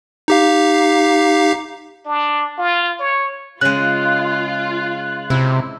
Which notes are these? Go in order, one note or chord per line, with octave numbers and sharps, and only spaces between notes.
D#4 G4 F5
D4
F4
C#5
C#3 G#3 F4 F#6
C3 E4